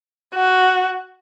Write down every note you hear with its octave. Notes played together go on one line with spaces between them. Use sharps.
F#4